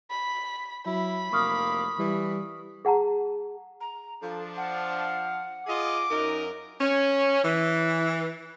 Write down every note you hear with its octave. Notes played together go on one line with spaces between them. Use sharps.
B5
F#3 E4 B5
F1 A#3 C#6 D#6 F6
E3 G3
G#4 F#5 A5 A#5
A#5
F3 D4 A4
F5 F#5
F4 G#4 D#5 D6
F#2 D#4 A#4 D#5
C#4
E3